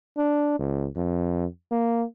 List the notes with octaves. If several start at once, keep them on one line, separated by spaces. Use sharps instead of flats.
D4
C#2
F2
A#3